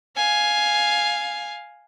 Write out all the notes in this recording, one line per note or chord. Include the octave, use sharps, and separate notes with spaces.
F5 G#5